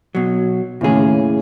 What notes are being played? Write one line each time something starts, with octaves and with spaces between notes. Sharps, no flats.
B2 F#3
D#2 A2 C#3 E3 G#4